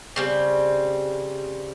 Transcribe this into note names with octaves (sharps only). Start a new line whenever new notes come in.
C#3 G3 C4